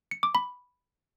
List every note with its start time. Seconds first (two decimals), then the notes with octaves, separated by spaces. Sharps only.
0.11 C#7
0.23 D6
0.35 B5